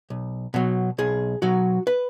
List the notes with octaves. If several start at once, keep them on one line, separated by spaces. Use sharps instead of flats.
B1
B2 F#3
B1 G#4
B2 F#3 F#4
B4